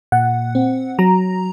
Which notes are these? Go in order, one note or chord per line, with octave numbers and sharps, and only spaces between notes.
A#2 F#5
C4
F#3 A#5